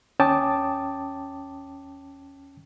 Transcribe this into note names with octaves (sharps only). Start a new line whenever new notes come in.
D#2 C#4 G5 A5 D6 D#6